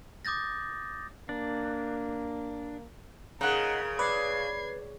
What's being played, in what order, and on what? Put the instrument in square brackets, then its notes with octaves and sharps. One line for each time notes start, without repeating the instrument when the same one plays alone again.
[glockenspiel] D6 D#6 G6 A6 A#6
[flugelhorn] A#3 [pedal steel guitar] D4
[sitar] C#3 [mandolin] D#4 F#5 [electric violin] A#4
[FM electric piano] B4 [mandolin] D5 [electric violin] G#6 C7